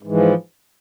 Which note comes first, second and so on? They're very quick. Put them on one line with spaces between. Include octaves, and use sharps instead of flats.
G#2 E3 F3